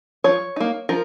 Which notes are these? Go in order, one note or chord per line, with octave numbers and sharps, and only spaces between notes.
F3 C#5
A#3 D#4
F3 A#4